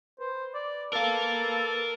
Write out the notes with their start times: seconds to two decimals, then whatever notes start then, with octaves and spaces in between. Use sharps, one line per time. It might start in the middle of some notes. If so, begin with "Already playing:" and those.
0.20 B4 C5
0.54 D5
0.93 A4 A#4 F5